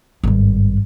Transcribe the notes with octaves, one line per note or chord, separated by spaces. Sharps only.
G#1 G2